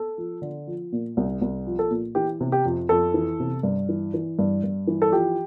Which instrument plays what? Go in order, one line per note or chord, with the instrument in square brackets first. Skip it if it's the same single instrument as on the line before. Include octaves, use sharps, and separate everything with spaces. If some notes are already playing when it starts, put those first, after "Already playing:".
Already playing: [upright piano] A4
F3
D3
F3
A#2
C2
C2
F3
A4
A#2
E3 G4
C3
G4
F2
F2 A4
E3
C3
G2
E3
E3
G2
G2
E3
A4
F3 G4